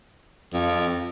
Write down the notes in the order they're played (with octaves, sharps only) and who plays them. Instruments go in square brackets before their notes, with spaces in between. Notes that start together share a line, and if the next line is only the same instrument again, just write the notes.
[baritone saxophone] F2